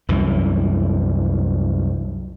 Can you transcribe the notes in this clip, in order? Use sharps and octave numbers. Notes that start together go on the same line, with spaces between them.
C2 F#2 E3